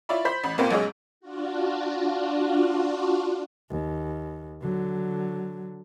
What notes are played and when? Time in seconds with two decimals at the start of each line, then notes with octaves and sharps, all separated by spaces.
0.09 E4 F4 C#5 D5 E5 B5
0.25 C5 B5 G6 B6
0.44 A1 B5
0.58 C2 A#2 A#3 C4 A#4 B4
0.71 B1 F#2 G#3 G#4 C#5 E6
1.20 D4 F4 F#4
3.70 D#2
4.61 D3 F#3